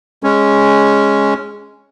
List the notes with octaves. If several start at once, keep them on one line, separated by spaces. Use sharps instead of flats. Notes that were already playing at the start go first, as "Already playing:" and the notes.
G#3 C#4